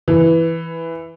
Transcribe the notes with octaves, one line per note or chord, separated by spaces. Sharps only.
E3